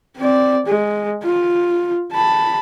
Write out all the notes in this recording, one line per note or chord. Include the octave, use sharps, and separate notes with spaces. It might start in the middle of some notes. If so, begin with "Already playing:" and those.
C4 D5
G#3
F4
A5 B5